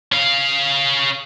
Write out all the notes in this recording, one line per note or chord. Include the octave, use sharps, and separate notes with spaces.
C#4 F5